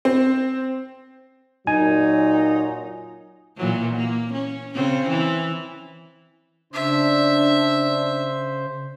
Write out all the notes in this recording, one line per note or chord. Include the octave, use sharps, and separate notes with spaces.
C4
A#2 F#3 D#4 G#5
A#2 E3 F#3
A#3
C#4
C#3 C4 C#4
E3
C#3 D4 C5 E5